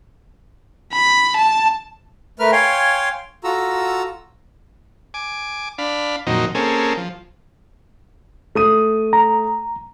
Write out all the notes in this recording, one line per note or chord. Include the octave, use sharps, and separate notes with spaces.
B5
A5
A3 A#4 B4 F6
C#5 F5 G5 G#5 C6
F4 F#4 A4 A#5 E6
G#5 D6
D4 F5 B5
F2 A#2 D#3 F#3 C4 D#4
A#3 C4 C#4 G#4 A4
F3
A3 D#6 D#7
A#5